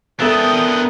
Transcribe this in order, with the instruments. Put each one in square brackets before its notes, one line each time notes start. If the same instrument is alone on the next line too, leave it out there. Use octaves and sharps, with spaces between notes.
[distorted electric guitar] B3 D4 [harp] A4 E5 [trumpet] A#4 [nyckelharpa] G5 D#6